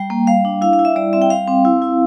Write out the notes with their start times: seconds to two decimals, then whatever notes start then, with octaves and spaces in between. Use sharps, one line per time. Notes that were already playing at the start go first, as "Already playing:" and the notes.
Already playing: G3 G5
0.10 A#3
0.27 G3 F5
0.45 D4
0.62 E4 F5
0.73 F5
0.79 E4
0.85 E5
0.96 G3 D5
1.13 C4 E5
1.22 G5
1.30 G3 F5
1.47 C4
1.65 E4
1.82 E4